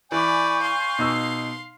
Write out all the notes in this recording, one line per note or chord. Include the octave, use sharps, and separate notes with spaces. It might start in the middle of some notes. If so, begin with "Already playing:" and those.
E3 D5 G#5 B5 C#6 G6
F5 C6
B2 D#4 E6